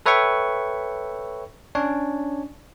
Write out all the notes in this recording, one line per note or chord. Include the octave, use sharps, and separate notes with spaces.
A4 B4 C#5 E5 G5 C#6
C#4 D4 C#5